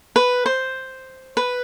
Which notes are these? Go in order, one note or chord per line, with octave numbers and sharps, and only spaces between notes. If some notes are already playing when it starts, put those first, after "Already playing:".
B4
C5
B4